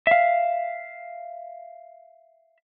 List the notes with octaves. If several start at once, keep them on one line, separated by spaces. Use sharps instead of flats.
E5 F5